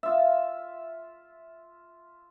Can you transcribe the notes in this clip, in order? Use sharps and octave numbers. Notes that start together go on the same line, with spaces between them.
F4 E5